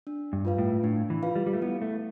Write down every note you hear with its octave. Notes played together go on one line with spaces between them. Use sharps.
D4
G2
F4 B4 F5
A2
A2 D4
E3
F4 B4 F5
G3
G3
A3
B3 E4
A3